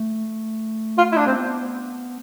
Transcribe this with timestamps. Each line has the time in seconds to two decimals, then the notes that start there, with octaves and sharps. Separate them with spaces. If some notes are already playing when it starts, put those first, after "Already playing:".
Already playing: A3
0.98 F4
1.12 E4
1.17 D4
1.26 C4
1.36 B3